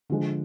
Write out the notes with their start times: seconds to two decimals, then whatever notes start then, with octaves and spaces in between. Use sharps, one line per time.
0.10 D3 F3 G#3